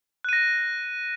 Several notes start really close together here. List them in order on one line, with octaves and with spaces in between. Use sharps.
F#6 D#7 A#6